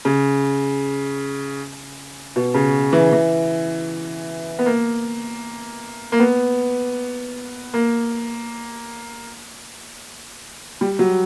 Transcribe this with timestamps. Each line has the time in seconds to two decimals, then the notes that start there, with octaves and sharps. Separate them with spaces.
0.05 C#3
2.36 B2
2.54 C#3
2.92 E3
3.12 E3
4.59 B3
4.66 A#3
6.12 A#3
6.20 B3
7.74 A#3
10.81 G3
10.99 F#3